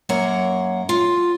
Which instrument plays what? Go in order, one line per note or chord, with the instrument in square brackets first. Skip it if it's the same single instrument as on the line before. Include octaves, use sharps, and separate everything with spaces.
[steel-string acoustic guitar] F#2 A#3 C#5 F#5 A#5
F4